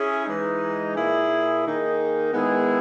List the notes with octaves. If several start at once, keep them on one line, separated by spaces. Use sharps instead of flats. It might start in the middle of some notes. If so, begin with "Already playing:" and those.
Already playing: C#4 E4 G#4
E3 G#3 D#4
A#2 A#3 E4 G#4
D#3 A#3 D#4 G#4
D#3 G#3 B3 E4 G#4